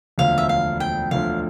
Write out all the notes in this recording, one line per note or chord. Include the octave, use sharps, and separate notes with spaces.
E1 D2 D3 F3 F5
E5
F5
G5
E1 D2 D3 F3 F5